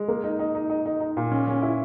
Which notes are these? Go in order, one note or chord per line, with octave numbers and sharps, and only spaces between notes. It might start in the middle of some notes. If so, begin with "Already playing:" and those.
Already playing: G#3
A#3
D#4
D#4
D#4
D#4
D#4
D#4
A#2
C#4
C#4
E4